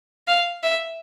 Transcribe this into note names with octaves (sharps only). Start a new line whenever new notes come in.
F5
E5